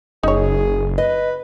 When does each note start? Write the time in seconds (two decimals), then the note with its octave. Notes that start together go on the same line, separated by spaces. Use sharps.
0.23 F#1 D#4 G#4 C#5
0.98 B4 D#5